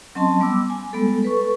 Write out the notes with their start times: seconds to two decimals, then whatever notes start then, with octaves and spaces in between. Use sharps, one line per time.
0.15 F#3 C4 C#4 D#5 A5 C6
0.40 G3 B3 D6 E6
0.70 G#5
0.93 G3 G#3 B3 A4
1.22 A4 B4 C#6